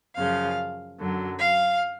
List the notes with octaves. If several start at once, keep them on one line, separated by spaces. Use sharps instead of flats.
F#2 C#3 F3 F5
F#2 D3 F#3
F5